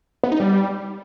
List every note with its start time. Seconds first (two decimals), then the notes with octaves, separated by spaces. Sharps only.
0.23 B3
0.32 D#4
0.40 G3